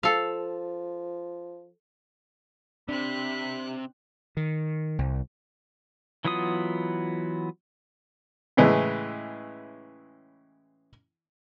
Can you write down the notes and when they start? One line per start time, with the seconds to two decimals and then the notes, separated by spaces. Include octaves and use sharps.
0.03 F3 A4 F5
2.89 C3 C4 D4 B5 F#6
4.37 D#3
4.99 C2
6.25 E3 F#3 B3 F4 D#6
8.57 A2 C#3 E3 G#3